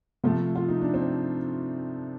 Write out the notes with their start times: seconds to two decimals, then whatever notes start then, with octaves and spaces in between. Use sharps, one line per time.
0.24 C3 F3 A3 F4
0.56 F4
0.68 D#4
0.81 D4
0.94 C4